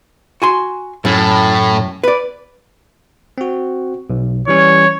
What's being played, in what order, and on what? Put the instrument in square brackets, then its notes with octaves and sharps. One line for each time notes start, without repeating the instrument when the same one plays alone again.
[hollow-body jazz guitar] F#4 G#5 C6
[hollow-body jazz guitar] F#2 [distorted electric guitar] A2
[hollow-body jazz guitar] B4 D5
[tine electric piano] C4 F#4
B1
[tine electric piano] E3 G3 C#4 [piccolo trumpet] C#5